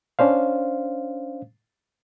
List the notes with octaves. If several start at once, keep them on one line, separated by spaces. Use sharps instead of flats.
C#4 D4 C5 F5